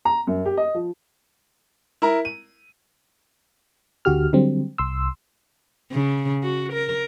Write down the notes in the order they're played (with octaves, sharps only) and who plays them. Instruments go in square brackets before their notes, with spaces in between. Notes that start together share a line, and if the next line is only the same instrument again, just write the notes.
[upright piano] A#5
F#2
G4
D#5
F3
E4 A#4 A#5
D#7
[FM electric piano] D2 D3 F#4 G4 F6
D3 F#3 G3 C4
C2 C6 E6
[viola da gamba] C#3
F#4
A#4